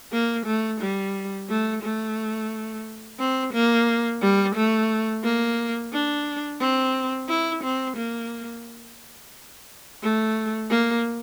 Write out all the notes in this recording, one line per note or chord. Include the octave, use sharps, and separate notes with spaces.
A#3
A3
G3
A3
A3
C4
A#3
G3
A3
A#3
D4
C4
E4
C4
A#3
A3
A#3